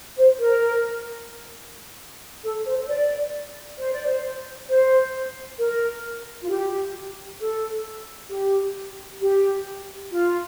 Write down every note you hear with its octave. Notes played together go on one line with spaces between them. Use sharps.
C5
A#4
A4
C5
C5
D5
C5
D5
C5
C5
A#4
F4
G4
A4
G4
G4
F4